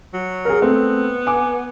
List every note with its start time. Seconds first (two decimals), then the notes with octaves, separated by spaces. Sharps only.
0.14 F#3
0.45 G#4 A#4
0.62 A3 B3 C4
1.27 G#5 D6